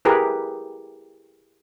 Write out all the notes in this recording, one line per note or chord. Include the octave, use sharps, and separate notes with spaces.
E4 G4 G#4 A#4 B4